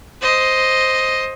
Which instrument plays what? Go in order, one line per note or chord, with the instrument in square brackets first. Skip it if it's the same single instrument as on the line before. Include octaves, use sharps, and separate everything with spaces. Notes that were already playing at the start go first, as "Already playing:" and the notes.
[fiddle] C5 D#5